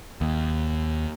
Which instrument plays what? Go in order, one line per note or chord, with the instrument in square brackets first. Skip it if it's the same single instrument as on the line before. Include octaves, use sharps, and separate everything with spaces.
[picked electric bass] D#2